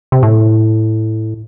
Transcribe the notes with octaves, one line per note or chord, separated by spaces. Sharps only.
C3
A2